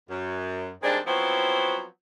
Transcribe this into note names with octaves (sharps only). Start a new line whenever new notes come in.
F#2
D#3 G3 G#3 C4 D4
F3 F#3 B3 C4 E4 F#4